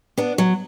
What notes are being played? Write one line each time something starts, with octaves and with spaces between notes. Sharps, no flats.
B3 D4
F#3